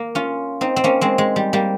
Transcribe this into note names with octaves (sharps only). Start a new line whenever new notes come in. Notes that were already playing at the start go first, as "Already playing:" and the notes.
Already playing: A#3
C#4 F4
C4 D#4
C4
A#3 C#4
G#3 C4
G#3
G3
G3 A#3